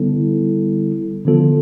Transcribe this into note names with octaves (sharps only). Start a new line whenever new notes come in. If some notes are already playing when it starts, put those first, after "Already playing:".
Already playing: D3 G3 B3 E4 A4
D3 F3 B3 F4 A4